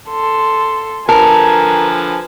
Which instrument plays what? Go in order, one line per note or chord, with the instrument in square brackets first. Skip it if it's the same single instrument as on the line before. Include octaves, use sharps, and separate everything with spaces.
[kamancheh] A4 C6
[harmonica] D3 F3 B4 [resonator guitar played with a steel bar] A#4 [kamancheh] G#5 [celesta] A5